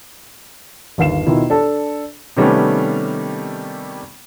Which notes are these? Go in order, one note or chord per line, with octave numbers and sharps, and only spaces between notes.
G1 D#2 F5 C7 E7
B2 D#3 E4 F4
D4 A4 A5
C3 D#3 G3 A3 B3 C#4